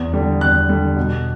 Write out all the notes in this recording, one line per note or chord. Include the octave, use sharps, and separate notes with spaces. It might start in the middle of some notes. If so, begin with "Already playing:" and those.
Already playing: E2
D3 G3
E2 F#6
D3 G3
B2